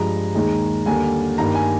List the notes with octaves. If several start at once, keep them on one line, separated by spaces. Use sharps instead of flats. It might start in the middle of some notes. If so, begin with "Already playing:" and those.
Already playing: G2 F3 G#3 A#5
D#2 D#3 G#3
D#2 D3 G3 A#3 G#5
G2 D#3 A#3 A#5
G#5